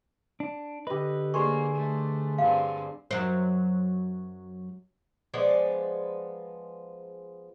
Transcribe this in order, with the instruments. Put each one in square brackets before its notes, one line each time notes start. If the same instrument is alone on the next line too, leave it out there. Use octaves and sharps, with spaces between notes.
[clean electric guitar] D4
[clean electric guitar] D3 B4 [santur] G4 D#5
[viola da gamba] A#3 [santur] G#4 C5 D5 [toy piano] C#6
[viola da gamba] A3
[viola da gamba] G2 D3 C4 [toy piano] F5
[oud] F#2 F#3 C5
[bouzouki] F3 G#3 B3 D5